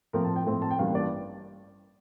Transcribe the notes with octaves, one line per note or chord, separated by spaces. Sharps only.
A2 F3 C4 A#4
A5
G5
A2 F3 C4
A5
G5
A1 G2 E3 G3 A#3 F5
D5